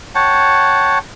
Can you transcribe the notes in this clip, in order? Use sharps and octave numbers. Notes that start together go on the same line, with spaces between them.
C#5 F#5 G5 A5